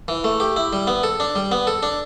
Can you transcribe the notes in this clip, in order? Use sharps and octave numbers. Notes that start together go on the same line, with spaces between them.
E3
A3
G4
E4
G3
B3
A4
D4
G3
B3
A4
D4